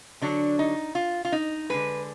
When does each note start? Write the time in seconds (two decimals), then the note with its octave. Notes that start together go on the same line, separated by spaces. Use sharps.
0.21 D3 F#3 D4
0.59 D#4
0.95 F4
1.25 F4
1.32 D#4
1.69 D3 G#3 B4